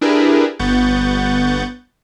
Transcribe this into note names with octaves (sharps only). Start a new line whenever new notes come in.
D4 E4 G4 G#4 A#4 B4
G1 B3 F#5 C#6 G6 A6